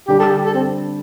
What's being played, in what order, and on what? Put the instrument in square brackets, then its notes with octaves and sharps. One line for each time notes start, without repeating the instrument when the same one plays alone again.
[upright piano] D3 G3 D4 [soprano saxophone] G4
[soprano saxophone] A4
G4
A4
C4